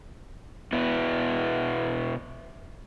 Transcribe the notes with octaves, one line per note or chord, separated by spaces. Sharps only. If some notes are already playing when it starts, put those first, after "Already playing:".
B2 B3 E4